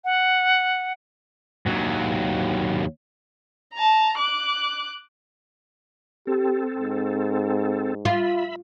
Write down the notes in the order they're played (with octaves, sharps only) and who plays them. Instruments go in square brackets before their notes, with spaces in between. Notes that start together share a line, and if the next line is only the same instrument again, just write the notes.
[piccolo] F#5
[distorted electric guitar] D#2 F#3
[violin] A5 A#5
D6 F#6
[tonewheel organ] C4 A4 [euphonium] G4
[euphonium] G#2
[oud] F4 [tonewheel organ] E5 B5